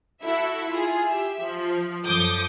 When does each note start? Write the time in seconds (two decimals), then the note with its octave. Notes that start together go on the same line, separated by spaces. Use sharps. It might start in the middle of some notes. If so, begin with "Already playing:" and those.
0.23 E4 F#4 A4 E5
0.70 F4 G#4
1.10 G4 E5
1.43 F3
2.05 F#2 F3 A4 D6 D#6 G6